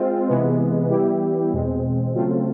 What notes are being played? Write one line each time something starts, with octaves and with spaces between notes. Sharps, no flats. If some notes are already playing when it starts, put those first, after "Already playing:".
Already playing: G#3 C4 F4
C3 E3 G#3 B3
E3 G3 B3 E4 G4
E2 B2 G#3 C4
C#3 F#3 A3 C4 F4